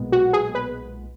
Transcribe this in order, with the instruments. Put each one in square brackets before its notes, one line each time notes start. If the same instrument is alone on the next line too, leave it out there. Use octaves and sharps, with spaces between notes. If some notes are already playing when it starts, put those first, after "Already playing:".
Already playing: [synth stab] B1 A#2 G#3 B3
F#4
G#4
B4